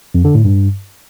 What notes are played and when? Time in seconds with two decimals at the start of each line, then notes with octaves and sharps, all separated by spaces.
0.14 F2
0.25 D3
0.35 A2
0.45 G2